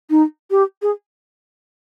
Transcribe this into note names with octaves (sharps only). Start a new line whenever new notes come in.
D#4
G4
G#4